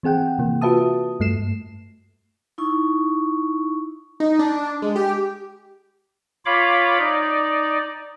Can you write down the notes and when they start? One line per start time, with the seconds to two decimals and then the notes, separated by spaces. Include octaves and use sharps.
0.03 E3 C4 G#4 F#5 G5
0.38 C3 E3 A#3
0.61 F4 F#4 B4 E5 A5 D#6
1.20 G2 A3 C7 E7
2.58 D#4 E4 C#6
4.20 D#4
4.39 D4
4.82 G#3
4.96 G4
6.46 F4 C#5 F5 B5 D6
6.98 D#4 D5